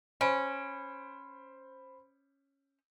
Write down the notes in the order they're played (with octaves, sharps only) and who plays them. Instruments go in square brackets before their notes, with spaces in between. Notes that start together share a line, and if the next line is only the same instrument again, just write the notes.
[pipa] C#4 [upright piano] C5 B5 D7